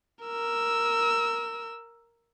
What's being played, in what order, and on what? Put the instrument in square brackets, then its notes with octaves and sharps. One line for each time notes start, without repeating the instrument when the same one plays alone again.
[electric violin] A#4 E6